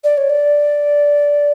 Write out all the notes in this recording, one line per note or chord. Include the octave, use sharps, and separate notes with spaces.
D5
C#5
D5